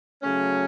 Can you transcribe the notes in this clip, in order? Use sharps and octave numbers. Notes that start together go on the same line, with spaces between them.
C#3 F#3 A3 C#4